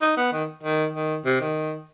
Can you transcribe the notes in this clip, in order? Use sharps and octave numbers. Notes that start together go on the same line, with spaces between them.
D#4
B3
D#3
D#3
D#3
C3
D#3